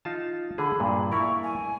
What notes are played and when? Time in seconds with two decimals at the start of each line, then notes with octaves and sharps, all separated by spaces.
0.05 D#4 F4 A5
0.58 D3 G#4 B5
0.80 G2 A#2
1.11 E4 A#4 D5 C#6
1.43 G#5